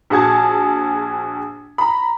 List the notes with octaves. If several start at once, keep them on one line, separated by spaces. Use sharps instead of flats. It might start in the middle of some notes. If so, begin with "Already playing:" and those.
A#1 F#4 G#4 A5 G#6
A#5 B5